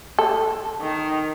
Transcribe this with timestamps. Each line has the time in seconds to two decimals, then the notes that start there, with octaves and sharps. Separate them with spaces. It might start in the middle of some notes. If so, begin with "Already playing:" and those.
0.19 A4
0.81 D#3